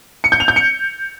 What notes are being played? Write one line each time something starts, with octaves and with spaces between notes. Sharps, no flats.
C#7
G6
F7
G6
C#7